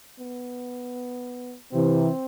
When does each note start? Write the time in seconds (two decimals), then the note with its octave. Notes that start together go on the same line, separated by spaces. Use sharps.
0.19 B3
1.72 C3 E3 C4